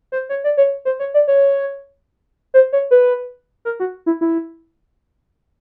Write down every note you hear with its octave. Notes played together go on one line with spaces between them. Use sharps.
C5
C#5
D5
C#5
C5
C#5
D5
C#5
C5
C#5
B4
A#4
F#4
E4
E4